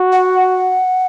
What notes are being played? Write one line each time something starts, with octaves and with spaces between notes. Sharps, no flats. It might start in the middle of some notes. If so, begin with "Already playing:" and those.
Already playing: F#4
F#5